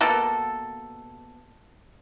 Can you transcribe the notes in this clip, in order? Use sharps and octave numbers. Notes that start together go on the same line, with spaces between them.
B2 A#3 A4